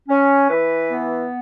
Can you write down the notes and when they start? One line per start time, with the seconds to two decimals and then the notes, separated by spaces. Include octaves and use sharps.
0.09 C#4
0.50 E3 B4
0.90 B3